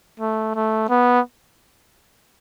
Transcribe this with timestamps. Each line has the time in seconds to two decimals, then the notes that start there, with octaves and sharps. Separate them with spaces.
0.20 A3
0.55 A3
0.89 B3